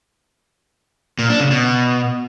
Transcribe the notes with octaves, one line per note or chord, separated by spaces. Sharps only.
A#2
D4
C#3
B2